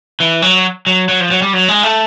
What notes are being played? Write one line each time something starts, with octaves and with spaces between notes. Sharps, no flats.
E3
F#3
F#3
F#3
F3
F#3
G3
F#3
G#3
A3